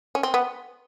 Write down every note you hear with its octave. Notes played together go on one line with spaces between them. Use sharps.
C#4
C4
B3